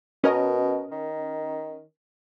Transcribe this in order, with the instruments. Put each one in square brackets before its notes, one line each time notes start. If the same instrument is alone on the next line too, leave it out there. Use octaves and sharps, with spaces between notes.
[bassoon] B2 [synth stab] C#4 A#4 D#5
[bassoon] D#3